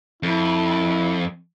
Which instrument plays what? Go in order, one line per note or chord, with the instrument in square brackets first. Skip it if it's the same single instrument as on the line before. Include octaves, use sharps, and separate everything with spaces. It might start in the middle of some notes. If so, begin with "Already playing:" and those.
[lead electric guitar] F2 [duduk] E4